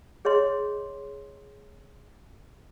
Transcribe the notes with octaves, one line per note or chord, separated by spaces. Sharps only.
G#4 C#5 D#5 C6